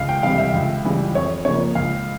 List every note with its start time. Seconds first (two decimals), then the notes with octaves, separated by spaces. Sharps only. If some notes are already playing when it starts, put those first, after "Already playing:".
Already playing: C#2 F5
0.09 G5
0.23 C3 E3 G3 F5
0.38 E5
0.54 C#2
0.84 C#3 E3 G3
1.15 F2 C#5
1.45 C#3 F3 A#3 C#5
1.75 C#2 F5